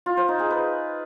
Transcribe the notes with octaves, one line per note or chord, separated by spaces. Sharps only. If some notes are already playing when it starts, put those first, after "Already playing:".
F4
C5
D#4
G#4
B4